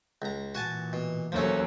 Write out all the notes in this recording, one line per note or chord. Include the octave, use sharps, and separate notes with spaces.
C#2 A#5
A#2 E3 F#4 G#5 A5
B2
D#2 F3 F#3 A3 C#4